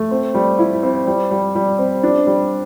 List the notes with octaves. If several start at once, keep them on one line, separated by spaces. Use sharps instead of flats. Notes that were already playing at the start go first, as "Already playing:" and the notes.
Already playing: A3
C4
G3
E4
C4
G3
G3
G3
C4
D4
G3